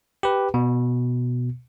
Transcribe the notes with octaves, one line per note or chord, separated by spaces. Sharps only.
G4 B4
B2